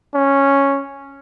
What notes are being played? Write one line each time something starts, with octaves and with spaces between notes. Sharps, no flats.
C#4